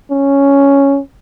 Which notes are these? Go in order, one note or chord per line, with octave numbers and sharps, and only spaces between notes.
C#4